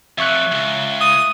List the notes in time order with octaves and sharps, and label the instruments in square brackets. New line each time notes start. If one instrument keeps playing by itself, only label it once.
[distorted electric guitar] F2 C3 [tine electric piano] E5 C#6 F#6
[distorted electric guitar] C#2
[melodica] D#6